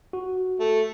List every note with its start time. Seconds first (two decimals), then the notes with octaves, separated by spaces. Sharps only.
0.13 F#4
0.60 A3